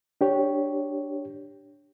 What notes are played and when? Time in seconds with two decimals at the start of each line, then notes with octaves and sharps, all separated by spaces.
0.21 D4 G4 C#5